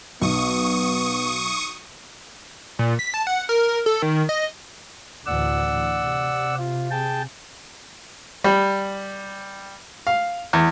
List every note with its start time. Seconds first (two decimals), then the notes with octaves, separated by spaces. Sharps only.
0.22 B1 B3 C#6 D#6
2.79 A#2
2.99 B6
3.14 A5
3.27 F#5
3.49 A#4
3.86 A4
4.02 D#3
4.29 D#5
5.26 D2 A2 E3 D5 F#5 E6
6.01 C3
6.58 F4
6.91 G#4 G5 A5
8.44 G3
10.07 F5
10.53 E2